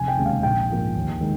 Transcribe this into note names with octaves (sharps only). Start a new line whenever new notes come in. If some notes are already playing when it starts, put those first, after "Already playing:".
Already playing: F1 G#5
G5
D#2 C#3 G#3
F5
A#1 G5
G#2 F3 A#3
D#2
D#3 G#3